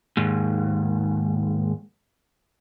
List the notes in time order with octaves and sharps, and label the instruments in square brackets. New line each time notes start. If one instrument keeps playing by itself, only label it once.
[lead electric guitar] D#2 G#2